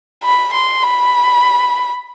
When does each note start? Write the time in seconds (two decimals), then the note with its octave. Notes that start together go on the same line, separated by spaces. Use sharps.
0.23 B5
0.54 C6
0.83 B5